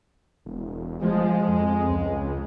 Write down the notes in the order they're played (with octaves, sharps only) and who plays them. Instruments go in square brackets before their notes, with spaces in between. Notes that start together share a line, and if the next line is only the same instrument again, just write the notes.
[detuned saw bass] E1
[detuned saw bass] F3 [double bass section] G#3
[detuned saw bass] F2
C#2